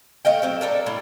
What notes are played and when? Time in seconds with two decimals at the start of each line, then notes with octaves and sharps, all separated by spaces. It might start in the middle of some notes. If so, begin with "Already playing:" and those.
0.25 A3 D#5 F5 G5
0.42 F#3 C4 G4
0.61 G3 D4 A4 A#4
0.86 A2 G3